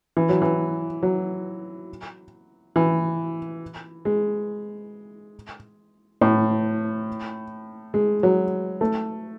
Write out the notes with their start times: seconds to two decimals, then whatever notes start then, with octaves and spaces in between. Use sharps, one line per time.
0.17 E3
0.29 F#3
0.42 E3
1.03 F#3
2.76 E3
4.05 G#3
6.21 A2
7.94 G#3
8.23 F#3
8.81 A3